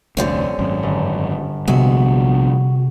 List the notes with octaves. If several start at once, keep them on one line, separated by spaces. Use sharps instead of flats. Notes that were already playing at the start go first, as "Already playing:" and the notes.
F1 D2 G2 D3 C4 C#4
G#1 F#2
G1
A#1 C3 G3 G#3 B3 F#4